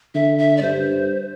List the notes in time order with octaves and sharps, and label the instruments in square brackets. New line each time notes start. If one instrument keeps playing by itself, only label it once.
[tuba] D3 [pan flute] E5
[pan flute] E5
D5
[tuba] G2 [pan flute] C5